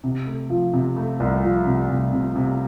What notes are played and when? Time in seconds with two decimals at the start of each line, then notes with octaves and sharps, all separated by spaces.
0.04 C3
0.26 A3
0.50 F3
0.74 C3
0.96 A3
1.20 C2
1.43 F3
1.66 C3
1.90 C2
2.13 C3
2.35 C3